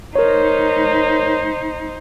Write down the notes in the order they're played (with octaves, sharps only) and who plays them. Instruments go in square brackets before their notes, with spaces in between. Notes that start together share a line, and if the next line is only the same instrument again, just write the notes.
[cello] D#4 C5 [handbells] A#4 C#5